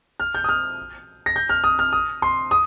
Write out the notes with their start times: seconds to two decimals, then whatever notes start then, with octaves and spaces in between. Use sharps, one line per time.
0.20 F6
0.35 G6
0.44 D#6
0.49 F6
1.26 A#6
1.36 G6
1.49 F6
1.64 D#6
1.79 F6
1.93 D#6
2.22 C6
2.51 D#6